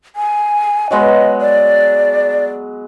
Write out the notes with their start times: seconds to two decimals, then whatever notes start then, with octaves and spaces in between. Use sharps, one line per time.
0.16 G#5
0.91 F#3 G#3 B3 D#5
1.41 D5